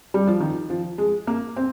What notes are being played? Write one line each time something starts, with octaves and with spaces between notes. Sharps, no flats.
G3
F3
D#3
F3
G#3
A#3
C4